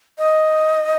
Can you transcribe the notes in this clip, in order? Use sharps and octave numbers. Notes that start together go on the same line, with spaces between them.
D#5